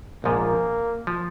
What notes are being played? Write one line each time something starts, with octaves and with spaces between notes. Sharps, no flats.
A#1 G#2 F3 A#3
F3